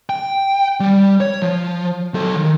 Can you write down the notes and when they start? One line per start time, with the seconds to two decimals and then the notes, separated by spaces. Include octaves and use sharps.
0.10 G5
0.80 G3
1.20 C#5
1.42 F3
2.14 F#3 A4
2.36 D#3